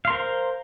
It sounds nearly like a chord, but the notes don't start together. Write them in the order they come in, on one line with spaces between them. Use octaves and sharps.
F5 C6 A#4 C5